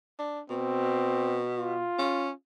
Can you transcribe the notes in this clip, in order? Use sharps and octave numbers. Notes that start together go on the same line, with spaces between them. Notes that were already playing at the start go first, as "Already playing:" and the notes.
D4
B2 C4
F4
C#4